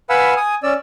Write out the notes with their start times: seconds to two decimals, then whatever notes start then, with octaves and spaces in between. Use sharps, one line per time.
0.10 B4 F5 F#5 G#5 B5 E6
0.37 G#5 D#6
0.63 C#4 D5 E6